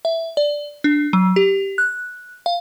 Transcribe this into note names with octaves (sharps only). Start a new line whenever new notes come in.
E5
D5
D4
F#3
G4
F#6
F5